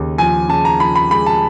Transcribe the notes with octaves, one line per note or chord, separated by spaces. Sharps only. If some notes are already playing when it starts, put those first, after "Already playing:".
Already playing: D#2 C#3
F3 G#5
C#3 A5
A#5
F3 B5
B5
G#3 B5
A5